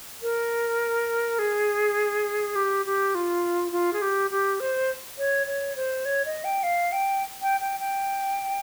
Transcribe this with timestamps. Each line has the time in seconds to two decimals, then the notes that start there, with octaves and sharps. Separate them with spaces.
0.22 A#4
1.39 G#4
2.56 G4
2.86 G4
3.15 F4
3.72 F4
3.93 G#4
4.02 G4
4.31 G4
4.60 C5
5.18 C#5
5.47 C#5
5.76 C5
6.05 C#5
6.25 D#5
6.44 G5
6.63 F5
6.92 G5
7.42 G5
7.61 G5
7.80 G5